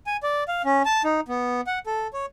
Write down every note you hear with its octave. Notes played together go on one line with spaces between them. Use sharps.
G#5
D5
F5
C#4
A5
D#4
B3
F#5
A4
C#5